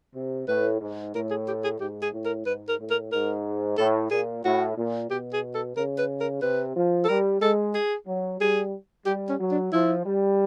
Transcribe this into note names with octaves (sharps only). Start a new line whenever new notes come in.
C3
A2 B4
G#2
A2 A#4
G#4
G4
G#4
G#2 G4
G#4
A2
A#4
G#2 B4
A#4
A2
A#4
G#2 A#4
A2 A4
A#2 G#4
A2 F#4
A#2
B2 G4
G#4
A4
C#3 A#4
B4
A#4
C3 B4
F3
A4
G3 A#4
G#3 A4
G#4
F#3
G3 G#4
G3 G4
C#4
F#3
D4
F3 E4
G3